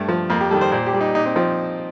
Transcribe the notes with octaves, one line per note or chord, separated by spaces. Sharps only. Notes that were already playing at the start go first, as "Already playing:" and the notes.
Already playing: G2 A3
F3
F2 A#3
G4
D#3 G3 A4
C5
A#2 C5
G4
G3
D#4
A#2 D#4
C4
F3 C4